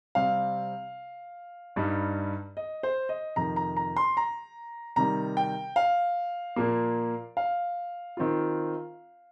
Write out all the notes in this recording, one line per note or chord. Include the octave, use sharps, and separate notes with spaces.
C3 G3 C4 F5
G2 G3 D#4
D#5
C5
D#5
F2 C3 D#3 A#5
A#5
A#5
C6
A#5
C3 D#3 G3 A#5
G5
F5
A#2 F3 A#3
F5
D#3 C4 F4